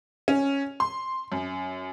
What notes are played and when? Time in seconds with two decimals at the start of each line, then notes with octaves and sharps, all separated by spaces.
0.28 C#4
0.80 C6
1.32 F#2